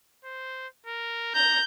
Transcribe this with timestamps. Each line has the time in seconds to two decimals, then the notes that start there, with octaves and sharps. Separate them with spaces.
0.25 C5
0.87 A#4
1.35 A#5 G6